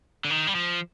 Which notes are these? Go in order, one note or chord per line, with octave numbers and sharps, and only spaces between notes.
D3
D#3
G3
F3